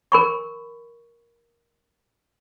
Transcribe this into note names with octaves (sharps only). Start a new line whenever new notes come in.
A#4 B5 C#6